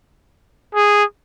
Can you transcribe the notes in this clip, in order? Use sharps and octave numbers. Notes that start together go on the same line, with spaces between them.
G#4